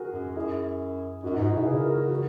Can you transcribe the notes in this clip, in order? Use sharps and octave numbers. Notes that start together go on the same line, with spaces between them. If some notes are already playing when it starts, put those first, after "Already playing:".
Already playing: F#4 G#4 A#4
F#2
F#2
F#2 E4 G#4
F#2 D#4 F#4
D#4 F#4
G#2
D#4 F#4
B2 E4 G#4
C#3 G#4 B4
F#4 A#4
F#4 A#4
F#4 A#4